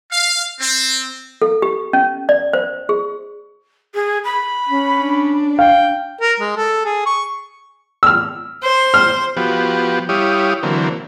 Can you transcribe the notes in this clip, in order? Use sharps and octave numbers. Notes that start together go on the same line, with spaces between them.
F5
C4
A4
G4
C#4
D5
C5
G#4
G#4
B5
C#4
D4
F5 G5
A#4
G#3
A4
G#4
C#6
E6 F6
C5
F6
F3 B3 F#4 G4
G3 E4 G4 C#5 F5 D#6
D3 E3 F#3 A#3 C4